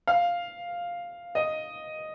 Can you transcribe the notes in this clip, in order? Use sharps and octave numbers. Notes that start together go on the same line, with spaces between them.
F5
D#5